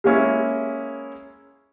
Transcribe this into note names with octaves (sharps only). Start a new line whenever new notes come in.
G#3 A#3 C#4 E4